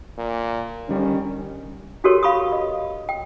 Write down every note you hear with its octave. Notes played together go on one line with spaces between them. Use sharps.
A#2
D3 D#3 G3 C#4
D4 F#4 G4 A4 A#4 C#5
F5 B5 C#6 D#6
D#5
G5